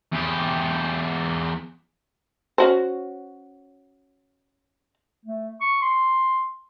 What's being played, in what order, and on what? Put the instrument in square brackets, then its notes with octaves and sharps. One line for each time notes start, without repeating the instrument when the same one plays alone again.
[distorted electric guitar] E2 G4
[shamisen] C#4 F#4 C5
[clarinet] A3
C#6
C6